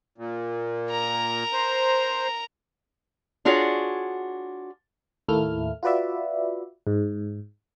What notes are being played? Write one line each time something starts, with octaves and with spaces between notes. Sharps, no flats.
A#2
A#4 A#5
C5
D4 F4 F#4 G#4 C#5
D#2 A2 A3 A#3 E4 F6
F4 F#4 B4 D5 E5
G#2